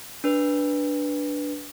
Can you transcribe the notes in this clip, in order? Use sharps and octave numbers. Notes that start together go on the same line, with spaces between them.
D4 B4